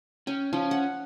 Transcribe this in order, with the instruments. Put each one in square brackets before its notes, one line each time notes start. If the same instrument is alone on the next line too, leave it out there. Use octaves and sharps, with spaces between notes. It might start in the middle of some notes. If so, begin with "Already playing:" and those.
[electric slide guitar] C#4 [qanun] G5
[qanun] F3 [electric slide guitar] C#4
[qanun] F#5